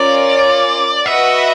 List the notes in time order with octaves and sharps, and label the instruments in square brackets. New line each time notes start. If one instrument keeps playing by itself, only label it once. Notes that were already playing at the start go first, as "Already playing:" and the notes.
Already playing: [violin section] C#4 F4 A#4 C#5 [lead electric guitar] D5
[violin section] F#4 B4 D#5 F#5 [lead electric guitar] E5